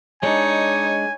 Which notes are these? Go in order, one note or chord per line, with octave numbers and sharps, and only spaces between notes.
G#3 D4 D#4 C#5 G#5